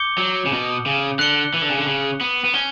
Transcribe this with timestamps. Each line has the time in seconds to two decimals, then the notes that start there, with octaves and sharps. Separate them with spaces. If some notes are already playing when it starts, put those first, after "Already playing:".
Already playing: D6 G6 C#7 G7
0.18 F#3
0.46 C#3
0.52 B2
0.86 C#3
1.19 D3 F#6 C#7 G7
1.54 E3
1.62 D3
1.70 C#3
1.78 D3
1.86 C#3
2.21 B3
2.45 B3
2.54 C#4 G7